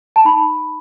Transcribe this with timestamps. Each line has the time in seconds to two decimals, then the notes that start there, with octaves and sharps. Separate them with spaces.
0.16 A5
0.25 D#4 B5